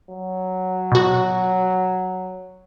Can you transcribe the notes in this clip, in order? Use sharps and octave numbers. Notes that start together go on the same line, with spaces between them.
F#3
B2 F#4